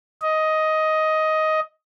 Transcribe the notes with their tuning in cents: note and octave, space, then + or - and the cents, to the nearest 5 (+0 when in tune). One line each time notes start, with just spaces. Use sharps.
D#5 +10